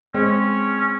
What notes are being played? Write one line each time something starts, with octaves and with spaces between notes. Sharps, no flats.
G#3 C4 C#4
C#4